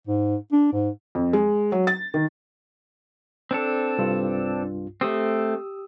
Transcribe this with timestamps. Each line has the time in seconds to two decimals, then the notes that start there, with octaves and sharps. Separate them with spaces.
0.07 G#2
0.52 D4
0.73 G#2
1.15 F2
1.33 G#3
1.72 F#3
1.87 A6
2.14 D#3
3.51 C4 D4 A4
3.98 C2 G2 F4
5.01 A3 C4 G4 D#6 E6